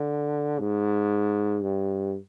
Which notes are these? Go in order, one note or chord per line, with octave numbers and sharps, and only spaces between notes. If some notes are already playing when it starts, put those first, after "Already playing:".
Already playing: D3
G#2
G2